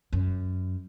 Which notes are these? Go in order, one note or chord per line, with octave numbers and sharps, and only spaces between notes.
F#2